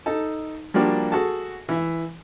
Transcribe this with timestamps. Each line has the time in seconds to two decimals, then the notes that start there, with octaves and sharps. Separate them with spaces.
0.06 D#4 A4 A5
0.74 F3 G3 A#3 D4 F#4
1.12 F#4 G#4 A4 A5
1.69 E3 E5